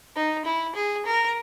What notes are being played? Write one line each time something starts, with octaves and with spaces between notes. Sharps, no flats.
D#4
E4
G#4
A#4